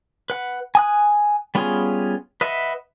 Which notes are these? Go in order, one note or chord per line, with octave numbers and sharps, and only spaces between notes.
B4 F#5
G#5 D#6 F#6
G3 B3 C#4 F4 G#4
B4 D#5 E5 F#5